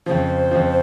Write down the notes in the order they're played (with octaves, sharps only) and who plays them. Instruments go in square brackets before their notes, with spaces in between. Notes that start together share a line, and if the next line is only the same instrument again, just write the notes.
[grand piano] F2 C#3 F3 [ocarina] C5
[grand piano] F2 C#3 F3